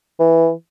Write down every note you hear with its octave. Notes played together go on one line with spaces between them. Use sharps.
E3